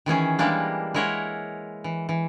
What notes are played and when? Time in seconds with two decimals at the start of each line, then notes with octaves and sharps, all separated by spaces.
0.06 D#3 E3 C#4 G#4
0.39 E3 G3 G#3 A#3 D4
0.94 G#3 E4 A#4 C#5 F#5
1.84 E3
2.09 E3